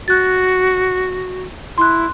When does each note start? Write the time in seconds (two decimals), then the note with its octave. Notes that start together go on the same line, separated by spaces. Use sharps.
0.08 F#4 F#6 A6
1.78 E4 C6 F#6